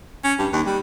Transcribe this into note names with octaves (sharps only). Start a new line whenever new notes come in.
C#4
G2
D#2
G3